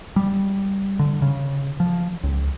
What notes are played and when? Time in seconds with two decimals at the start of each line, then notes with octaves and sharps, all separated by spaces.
0.16 G3
0.99 D3
1.22 C#3
1.80 F3
2.23 C#2